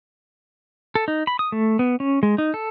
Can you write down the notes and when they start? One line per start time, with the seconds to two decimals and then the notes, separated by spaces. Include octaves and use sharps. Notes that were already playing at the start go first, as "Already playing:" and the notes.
0.95 A4
1.08 D#4
1.27 B5
1.39 D#6
1.52 A3
1.79 B3
2.00 C#4
2.23 G#3
2.38 D#4
2.54 A4